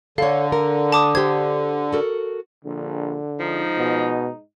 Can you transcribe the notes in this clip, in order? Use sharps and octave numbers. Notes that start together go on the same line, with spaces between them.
D3 A4 C#5 F5
A#4
A5 D6 D#6
G4 C5 G#6
F#4 A4 A#4
A#1 D3
G#2 F3 D#4
B2